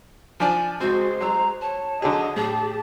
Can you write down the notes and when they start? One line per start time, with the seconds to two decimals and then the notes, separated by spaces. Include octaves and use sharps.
0.40 F3 D4 G#5
0.81 C#2 G#3 C4 F#4 C5
1.21 F#3 A#5 E6
1.61 C#5 A5
2.02 D3 F#3 D4 G#4 D#5
2.36 A2 G4 G#4 A5